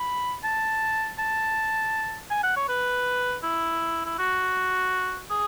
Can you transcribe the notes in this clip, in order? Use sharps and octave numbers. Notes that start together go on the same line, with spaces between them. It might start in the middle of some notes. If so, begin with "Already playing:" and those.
Already playing: B5
A5
A5
G#5
F#5
C#5
B4
E4
E4
F#4
G#4